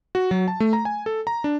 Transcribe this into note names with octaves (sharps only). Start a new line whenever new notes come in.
F#4
F#3
A5
A3
A#5
G#5
A4
A#5
D4